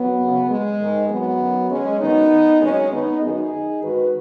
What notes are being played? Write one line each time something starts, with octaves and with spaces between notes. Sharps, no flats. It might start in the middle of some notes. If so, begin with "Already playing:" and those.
Already playing: F#3 B3
F#2 C#3
G#3
G#2 D#3
F#3 B3
F#2 D#3
G#3 C#4
F#2 D#3 B3 D#4
F#2 D#3 G#3 C#4
B3 D#4
F#2 D#3 D#4 G#4
G#2 D#3 F#4 B4